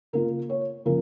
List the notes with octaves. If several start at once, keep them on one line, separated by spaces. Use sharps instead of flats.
C#3 A#3 F4 A#4
C#5
C#3 F3 A#3 A#4